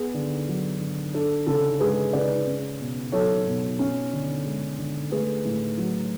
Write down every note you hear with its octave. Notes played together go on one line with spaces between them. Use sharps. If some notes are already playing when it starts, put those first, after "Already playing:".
Already playing: B3 G#4
D3
F#3
D3
D4 A4
C#3 A4
G#3 G#4 B4
C#3 B4 D5
C#4
B2
F#3 A4 C#5
B2
C#4
D3
G#3
D3
A3 G#4 B4
A2
F#3